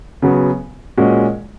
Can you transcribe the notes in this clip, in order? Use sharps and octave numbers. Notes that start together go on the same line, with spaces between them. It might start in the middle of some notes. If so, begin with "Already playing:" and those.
C#3 F#3 B3
A#2 G#3 C#4 F#4